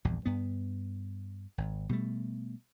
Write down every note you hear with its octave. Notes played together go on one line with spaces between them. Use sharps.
A#1 E2 G2
G2 B3
G#1
B2 G3 A3